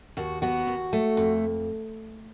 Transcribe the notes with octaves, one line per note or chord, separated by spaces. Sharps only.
D#2 F#4
B3 F#4
D#2
A3
F2